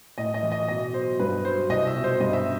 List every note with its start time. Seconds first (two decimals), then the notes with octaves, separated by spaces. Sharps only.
0.18 A2 D#5
0.34 D#5
0.43 E3
0.52 D#5
0.69 B2 D#5
0.93 F#3 C5
1.20 G2 B4
1.45 F#3 C5
1.69 C2 D#5
1.87 E5
1.95 B2
2.04 C5
2.20 G2 D#5
2.33 E5